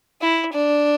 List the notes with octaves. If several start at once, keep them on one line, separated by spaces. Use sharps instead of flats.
E4
D4